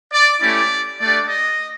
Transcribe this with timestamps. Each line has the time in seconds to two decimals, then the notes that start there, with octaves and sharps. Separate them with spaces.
0.13 D5
0.41 A3 C#4 E4 G4 D5
1.00 A3 D4 G4 D5
1.29 D#5